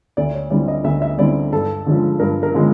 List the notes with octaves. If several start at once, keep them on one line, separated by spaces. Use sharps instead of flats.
D2 D5
C#5
D3 G3 C4 E4 D5
D#5
D2 E5
E5
D3 G3 C4 E4 D5
G2 A4
D3 F3 G#3 C#4
G2 A#4
A#4
D3 F3 G#3 C#4